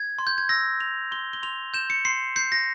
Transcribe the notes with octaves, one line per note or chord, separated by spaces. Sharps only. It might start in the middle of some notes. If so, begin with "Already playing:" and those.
Already playing: G#6
C6
G6
G#6
E6 A#6
E6 F7
C6 G7
G7
C6 F7
G6 E7
C#7
C6 C7
G6 C7
A#6